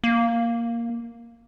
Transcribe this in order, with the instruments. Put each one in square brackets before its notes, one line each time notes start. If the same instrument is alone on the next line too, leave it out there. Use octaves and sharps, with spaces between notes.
[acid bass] A#3